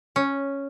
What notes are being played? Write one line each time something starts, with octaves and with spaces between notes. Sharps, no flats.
C#4